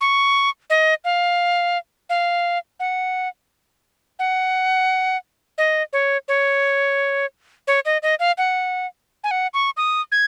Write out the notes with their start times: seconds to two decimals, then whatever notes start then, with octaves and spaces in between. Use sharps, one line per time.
0.01 C#6
0.70 D#5
1.05 F5
2.10 F5
2.80 F#5
4.19 F#5
5.58 D#5
5.93 C#5
6.28 C#5
7.67 C#5
7.85 D#5
8.03 D#5
8.20 F5
8.38 F#5
9.24 G#5
9.31 F#5
9.54 C#6
9.77 D#6
10.12 G#6